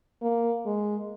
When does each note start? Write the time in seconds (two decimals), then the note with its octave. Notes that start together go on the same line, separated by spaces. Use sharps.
0.22 A#3
0.66 G#3